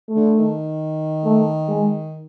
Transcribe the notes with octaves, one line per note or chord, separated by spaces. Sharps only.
A3
D3
D#3
A3
G#3